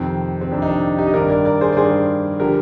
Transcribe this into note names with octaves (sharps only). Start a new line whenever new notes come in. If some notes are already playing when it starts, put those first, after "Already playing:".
Already playing: F2 C3 D#3 C4
C4
F2 C3 D#3 D4
D#4
D4
D#4 G4
D#5
G2 D#3 A#4 D5
A#4 D5
A#4 D5
G#4 C5
D5
G2 D#3 G#4 C5
D3 F3 G4 A#4